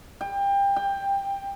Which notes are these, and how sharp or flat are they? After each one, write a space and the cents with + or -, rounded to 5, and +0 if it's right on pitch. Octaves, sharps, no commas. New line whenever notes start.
G5 +25
G5 +15